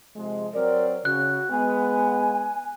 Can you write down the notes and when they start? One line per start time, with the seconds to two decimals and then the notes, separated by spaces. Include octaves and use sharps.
0.17 C3 F3 G#3
0.54 F#3 C4 A#4 D5
1.05 C#3 F#4 F#6
1.51 G#3 B3 G#5